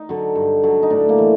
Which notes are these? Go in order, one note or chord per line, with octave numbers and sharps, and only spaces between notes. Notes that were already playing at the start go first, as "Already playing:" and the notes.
Already playing: D#4
D3 F#3
G2
D3 F#3
D#4
A2 D4
A#3
E3